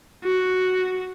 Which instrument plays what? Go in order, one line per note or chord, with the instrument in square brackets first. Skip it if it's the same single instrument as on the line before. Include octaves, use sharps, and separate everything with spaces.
[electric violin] F#4